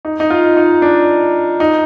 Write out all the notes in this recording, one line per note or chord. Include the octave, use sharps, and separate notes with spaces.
D#4
D#4
F4
D#4
D4
D#4